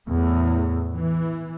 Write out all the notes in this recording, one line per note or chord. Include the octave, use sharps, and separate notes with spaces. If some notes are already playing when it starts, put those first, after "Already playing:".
E2 A2
E3